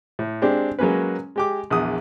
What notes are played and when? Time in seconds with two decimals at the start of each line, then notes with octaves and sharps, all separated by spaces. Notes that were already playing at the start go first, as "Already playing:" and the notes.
0.19 A2
0.42 G#3 C4 D4 G4
0.79 F#3 G#3 A#3 C#4 B4
1.36 G#3 G4 D6
1.70 A#1 E2 F#5 D#6